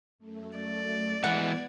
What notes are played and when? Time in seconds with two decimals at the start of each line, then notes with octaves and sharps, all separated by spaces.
0.18 F#2 A3
0.58 D5
1.24 G#2 E3 B3 F#5 G#6